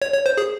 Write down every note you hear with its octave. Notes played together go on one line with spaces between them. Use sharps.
C#5
C#5
C5
G#4